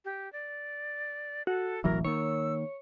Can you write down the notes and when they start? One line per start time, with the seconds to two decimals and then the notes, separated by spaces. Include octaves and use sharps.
0.05 G4
0.33 D5
1.47 F#4 A4
1.84 E1 A1 E3 F#3 A#4
2.04 D#3 A#3 C#5 E6